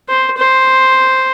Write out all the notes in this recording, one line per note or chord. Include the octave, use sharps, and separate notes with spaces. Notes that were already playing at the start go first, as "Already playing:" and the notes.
C5
C5